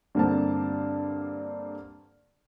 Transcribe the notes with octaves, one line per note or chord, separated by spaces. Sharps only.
G2 D3 A#3 C4 D4 A5